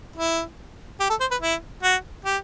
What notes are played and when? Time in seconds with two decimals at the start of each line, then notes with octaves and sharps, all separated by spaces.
0.16 E4
1.00 G4
1.10 A4
1.20 C5
1.31 B4
1.42 E4
1.83 F#4
2.24 G4